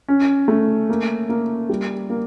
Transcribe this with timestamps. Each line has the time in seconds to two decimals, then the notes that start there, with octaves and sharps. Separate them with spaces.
0.08 C#4
0.48 A3
0.89 A#3
1.29 A#3
1.69 G3
2.10 A#3